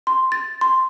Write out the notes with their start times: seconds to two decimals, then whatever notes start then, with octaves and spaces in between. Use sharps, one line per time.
0.07 C6
0.32 A6
0.61 C6